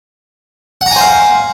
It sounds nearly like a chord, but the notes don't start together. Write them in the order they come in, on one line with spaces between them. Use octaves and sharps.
F#5 A#5 G#5 C5 F5